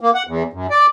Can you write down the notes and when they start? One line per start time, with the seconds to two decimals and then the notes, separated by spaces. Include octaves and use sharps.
0.01 A#3
0.15 F#5
0.27 E2
0.53 F#2
0.70 D5